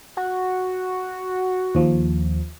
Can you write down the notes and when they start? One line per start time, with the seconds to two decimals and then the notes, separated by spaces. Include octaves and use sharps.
0.17 F#4
1.75 D#2 F3